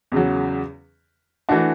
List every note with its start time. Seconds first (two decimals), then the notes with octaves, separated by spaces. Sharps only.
0.12 E2 C#3 F#3
1.49 E3 A3 D4 F#4